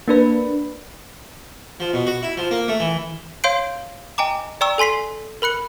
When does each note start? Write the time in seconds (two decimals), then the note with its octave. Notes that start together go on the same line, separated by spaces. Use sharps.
0.08 A#3 D4 B4
1.80 F3
1.93 B2
2.07 F#4
2.23 E4
2.37 F3
2.51 A#3
2.68 A3
2.80 E3
3.44 C#5 F5 C6 G6 C7 D7
4.18 D#5 G5 G#5 A#5 D6
4.61 D5 G5 A#5 C#6 E6
4.78 A4 G#5 C6 B6 C7
5.42 A#4 B5 F#6 C#7